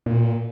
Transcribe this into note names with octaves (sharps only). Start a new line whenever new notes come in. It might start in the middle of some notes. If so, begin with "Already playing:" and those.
A#2